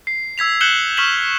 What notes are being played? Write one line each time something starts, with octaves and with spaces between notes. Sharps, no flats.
C7
E6 G#6 B6 F7
F#6 G6 C#7 E7 F#7 G7
C#6 F6 B6 E7 F#7